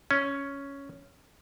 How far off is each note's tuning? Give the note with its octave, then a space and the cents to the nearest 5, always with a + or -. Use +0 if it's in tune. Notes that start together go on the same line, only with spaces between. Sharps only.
C#4 +5